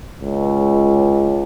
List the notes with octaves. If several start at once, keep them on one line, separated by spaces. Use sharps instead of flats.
C#2